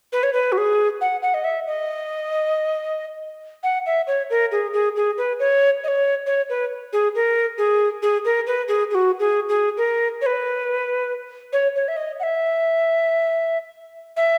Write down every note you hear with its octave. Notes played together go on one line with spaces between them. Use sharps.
B4
C#5
B4
F#4
G#4
F#5
F#5
D#5
E5
D#5
F#5
E5
C#5
A#4
G#4
G#4
G#4
B4
C#5
D#5
C#5
C#5
B4
G#4
A#4
G#4
G#4
A#4
B4
G#4
G#4
F#4
G#4
G#4
A#4
C#5
B4
C#5
C#5
E5
D#5
F#5
E5
E5